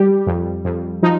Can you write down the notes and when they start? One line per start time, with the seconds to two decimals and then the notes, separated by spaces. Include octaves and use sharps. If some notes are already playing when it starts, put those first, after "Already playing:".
Already playing: G3 G4
0.27 F2
0.65 F2
1.03 F3 D#4